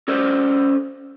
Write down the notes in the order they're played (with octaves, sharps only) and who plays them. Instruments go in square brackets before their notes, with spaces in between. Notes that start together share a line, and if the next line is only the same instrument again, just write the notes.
[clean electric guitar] C#4 A4 C5 D5